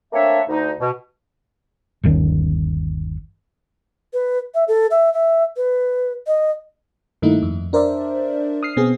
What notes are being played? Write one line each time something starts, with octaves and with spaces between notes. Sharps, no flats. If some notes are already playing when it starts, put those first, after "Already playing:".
A3 A#3 C4 D4 C#5 E5
D2 D#4
B2
G1 D#2 D#3 C#4
B4
E5
A4
E5
E5
B4
D#5
G2 D#3 A3 A#3 D#4 E4
F2
D4 A#4 C5 D5 E5
D#6 F6 C7
B2 B3 C4 G#4